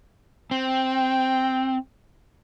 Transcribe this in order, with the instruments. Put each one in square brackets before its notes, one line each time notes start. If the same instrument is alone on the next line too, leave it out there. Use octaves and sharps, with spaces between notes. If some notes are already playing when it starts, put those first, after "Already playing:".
[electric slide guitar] C4 [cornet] G5